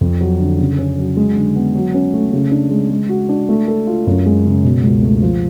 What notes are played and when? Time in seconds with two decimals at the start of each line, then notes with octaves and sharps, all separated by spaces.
0.01 F2
0.21 F#3
0.40 D3
0.58 C#3
0.79 C#4
0.98 F#3
1.17 G#3
1.36 D3
1.56 B3
1.75 F#3
1.94 C#4
2.14 A3
2.32 C#3
2.51 D4
2.71 G#3
2.90 G#3
3.09 F#4
3.29 D4
3.49 A3
3.68 A4
3.87 F4
4.07 F#2
4.26 G#3
4.45 C#3
4.64 B2
4.84 C#2
5.03 A3
5.22 F3